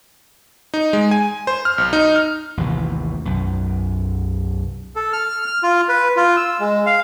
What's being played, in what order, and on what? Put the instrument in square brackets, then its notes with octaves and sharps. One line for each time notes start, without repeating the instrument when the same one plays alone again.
[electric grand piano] D#4
G#3
G#5
C5
F6
B1
D#4
F6
[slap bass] A1 D#2 C3 E3
B1 F#2
[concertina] A4
F6
F6
F4
B4
F4
E6
G#3
F5